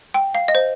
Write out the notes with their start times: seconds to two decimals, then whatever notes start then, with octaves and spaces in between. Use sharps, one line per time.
0.14 G5
0.35 F5
0.48 D#5
0.55 C5